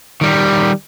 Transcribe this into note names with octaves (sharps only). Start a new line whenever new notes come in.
D#3 G3